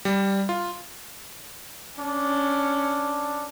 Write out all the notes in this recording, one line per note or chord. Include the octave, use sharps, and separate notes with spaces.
G3
F4
C#4 D4